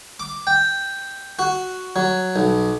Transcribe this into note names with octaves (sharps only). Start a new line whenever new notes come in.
D6
G5
F#4
F#3
B1